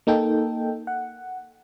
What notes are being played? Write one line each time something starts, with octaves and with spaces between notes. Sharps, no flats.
A#3 D#4 A4 G5
F#5